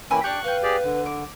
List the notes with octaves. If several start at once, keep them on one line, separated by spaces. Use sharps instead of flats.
E3 A#3 C#4 G5 G#5 B5 E6
D4 G4 C#6 F#6
B4 F5 G5
G4 G#4 D5
D3
D6